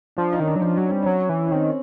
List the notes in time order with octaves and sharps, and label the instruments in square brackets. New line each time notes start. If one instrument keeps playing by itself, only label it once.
[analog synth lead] F3 [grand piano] D4
[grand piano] D#4
[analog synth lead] D#3 [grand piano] C#4
[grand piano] D4
[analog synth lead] F#3
[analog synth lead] F3 [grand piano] D4
[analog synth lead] F#3 [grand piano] C#4
[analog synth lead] G3 [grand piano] C4
[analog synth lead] F#3 [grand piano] C#4
[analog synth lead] E3
[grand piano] C#4
[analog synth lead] D#3 [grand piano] C4